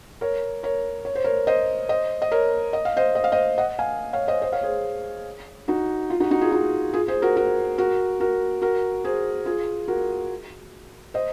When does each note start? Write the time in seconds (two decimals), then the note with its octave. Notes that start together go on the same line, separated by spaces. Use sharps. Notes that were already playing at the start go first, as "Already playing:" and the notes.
0.21 A#4 C#5
0.63 A#4 C#5
1.05 C#5
1.15 C5
1.24 A#4 C#5
1.47 C5 D#5
1.89 C5 D#5
2.22 D#5
2.32 A#4 C#5
2.73 D#5
2.85 F5
2.97 C5 D#5
3.15 D#5
3.24 F5
3.32 C5 D#5
3.58 D#5 F#5
3.79 F5 G#5
4.13 C#5 F5
4.28 C5 D#5
4.42 C5 D#5
4.52 C#5 F5
4.63 G#4 C5
5.68 D#4 F#4
6.10 F4
6.20 D#4 F#4
6.31 D#4 F#4
6.41 F4 G#4
6.52 D#4 F#4
6.93 F4 G#4
7.08 G#4 C5
7.22 F#4 A#4
7.37 F#4 A#4
7.78 F#4 A#4
8.20 F#4 A#4
8.62 F#4 A#4
9.05 G#4 C5
9.46 F4 G#4
9.88 F#4 A#4
11.14 C5 D#5